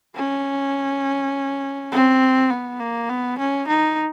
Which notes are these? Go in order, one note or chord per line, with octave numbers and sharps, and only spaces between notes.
C#4
C4
B3
A#3
B3
C#4
D#4